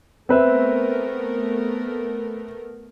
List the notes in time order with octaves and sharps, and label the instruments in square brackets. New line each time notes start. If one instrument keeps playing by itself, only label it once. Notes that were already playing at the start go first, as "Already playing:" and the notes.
[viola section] A3 B3 A#4 [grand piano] C4 B4 E5